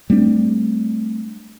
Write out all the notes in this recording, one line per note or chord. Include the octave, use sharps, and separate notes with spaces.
G3 A3 C4 D4